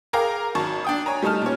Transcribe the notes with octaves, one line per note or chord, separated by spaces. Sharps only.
G#4 A#4 F5 G5 A#5 D6
G#1 F#3 A5 C#6
D4 G5 D#6
C#5 G#5 A#5
G3 A3 D#4 A5 F6
A#2 C#4